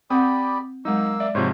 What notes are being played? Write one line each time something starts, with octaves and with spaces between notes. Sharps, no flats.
C4 G4 D5 F#5 G5 B5 D#6
F#3 G#3 A#3 D#4 E6
D5 E5
G#2 C3 F3 C5 C#5